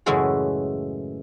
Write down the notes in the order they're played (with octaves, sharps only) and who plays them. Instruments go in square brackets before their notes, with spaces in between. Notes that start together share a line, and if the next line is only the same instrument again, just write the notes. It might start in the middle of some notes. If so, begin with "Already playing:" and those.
[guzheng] F#2 A2 C#3 E3 G#3 G#4